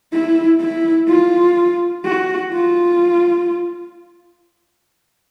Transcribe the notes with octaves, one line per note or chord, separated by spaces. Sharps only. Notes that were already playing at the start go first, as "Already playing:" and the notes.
E4
E4
F4
F#4
F4